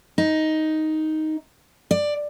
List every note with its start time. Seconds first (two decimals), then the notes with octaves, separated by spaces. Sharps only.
0.18 D#4
1.91 D5